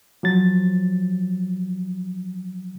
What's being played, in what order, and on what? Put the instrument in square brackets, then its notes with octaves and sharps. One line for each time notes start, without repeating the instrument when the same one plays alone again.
[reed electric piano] F3 F#3 A6